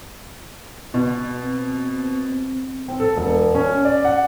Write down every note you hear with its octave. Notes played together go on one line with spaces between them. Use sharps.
B2
C4
C4
A4
E1
C#4
D5
F#5